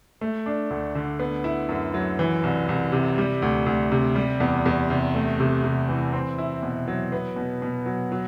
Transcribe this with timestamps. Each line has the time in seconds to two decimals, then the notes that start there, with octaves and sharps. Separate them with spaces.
0.21 A3
0.46 D4
0.70 D2
0.95 D3
1.20 B3
1.44 E4
1.69 F#2
1.94 F#3
2.19 E3
2.43 C2
2.69 C2
2.92 C3
3.18 G3
3.42 D2
3.66 D2
3.92 C3
4.16 G3
4.40 E2
4.66 E2
4.90 C3
5.15 A3
5.40 C3
5.64 C3
5.89 E3
6.13 C4
6.38 E4
6.63 B2
6.88 F#3
7.12 B3
7.36 B2
7.62 B2
7.86 F#3
8.12 F#3